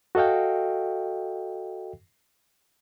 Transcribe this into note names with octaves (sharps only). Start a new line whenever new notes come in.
F#4 A4 D#5 F5 G5